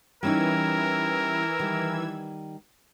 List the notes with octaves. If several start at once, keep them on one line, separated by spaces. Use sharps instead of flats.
E3 G3 C#4 D#4 A#4 E6 G#6
D#3 G3